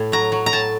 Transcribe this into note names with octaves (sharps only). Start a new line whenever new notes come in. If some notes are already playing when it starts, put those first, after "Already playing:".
Already playing: A2
F#3 A#5
F#3
A#5
A2 A5